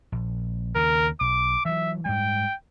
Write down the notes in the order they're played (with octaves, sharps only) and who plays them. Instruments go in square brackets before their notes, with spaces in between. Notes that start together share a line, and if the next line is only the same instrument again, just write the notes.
[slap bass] A#1
[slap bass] D#2 C#3 [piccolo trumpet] A#4
[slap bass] B1 [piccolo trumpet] D6
[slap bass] E3 F#3 [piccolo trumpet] E5
[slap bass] G#2 G3 [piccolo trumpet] G5